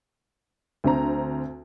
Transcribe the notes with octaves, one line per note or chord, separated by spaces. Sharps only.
D2 C4 A#5